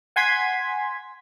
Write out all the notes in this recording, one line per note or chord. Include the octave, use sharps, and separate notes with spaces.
F#5 G#5 C6 G#6 B6